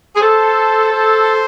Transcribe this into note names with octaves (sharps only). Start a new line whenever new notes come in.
G#4
A4 C5
C5